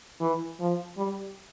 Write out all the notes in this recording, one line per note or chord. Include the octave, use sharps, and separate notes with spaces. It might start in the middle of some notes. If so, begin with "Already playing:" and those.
E3
F3
G3